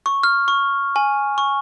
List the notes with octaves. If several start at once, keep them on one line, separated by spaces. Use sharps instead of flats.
C#6
F6
C#6
G#5
C#6